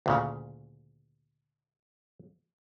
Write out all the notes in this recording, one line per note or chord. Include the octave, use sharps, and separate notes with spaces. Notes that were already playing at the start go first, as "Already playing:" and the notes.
D2 A#2 C#3